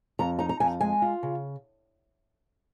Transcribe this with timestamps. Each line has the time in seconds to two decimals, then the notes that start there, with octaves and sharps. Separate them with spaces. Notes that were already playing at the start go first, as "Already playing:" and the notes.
0.19 F2 A#5
0.39 D#4 A#5
0.49 A#5
0.60 F2 G#5
0.81 G#3 G#5
1.02 F4
1.23 C#3